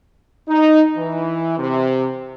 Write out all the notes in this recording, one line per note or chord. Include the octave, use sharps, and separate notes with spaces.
D#4
E3
C3